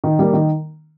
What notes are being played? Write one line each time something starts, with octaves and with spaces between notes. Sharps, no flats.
D#3
G3 A#3
D#3